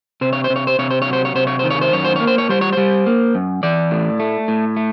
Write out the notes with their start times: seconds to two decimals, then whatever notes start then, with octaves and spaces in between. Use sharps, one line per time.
0.21 C3 C5
0.33 C#5
0.44 C5
0.50 C3
0.56 C#5
0.67 C5
0.79 C3 C#5
0.90 C5
1.02 C#5
1.07 F#3
1.13 C5
1.25 C#5
1.35 C3 C5
1.47 C#5
1.59 D#3 C5
1.70 C#5
1.81 C5
1.92 F#2 C#5
2.04 C5
2.16 A#3 C#5
2.27 C5
2.38 C#5
2.49 G3 C5
2.61 C#5
2.73 G3 C5
3.06 A#3
3.35 F#2
3.63 E3 D5
3.91 A2
4.20 A3
4.48 A2
4.76 A3